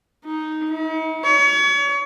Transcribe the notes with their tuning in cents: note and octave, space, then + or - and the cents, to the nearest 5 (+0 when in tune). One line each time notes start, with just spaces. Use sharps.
D#4 +0
D#4 +45
C#5 +35